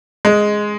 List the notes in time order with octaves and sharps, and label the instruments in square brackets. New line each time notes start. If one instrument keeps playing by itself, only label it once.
[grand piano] G#3